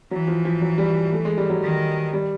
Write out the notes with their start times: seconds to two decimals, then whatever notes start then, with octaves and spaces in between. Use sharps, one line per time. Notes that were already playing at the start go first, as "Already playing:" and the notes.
0.11 E3 F#3
0.28 F3
0.45 F3
0.61 F#3
0.78 G3
1.12 A3
1.25 G#3
1.38 G3
1.50 F#3
1.62 D#3
2.13 G3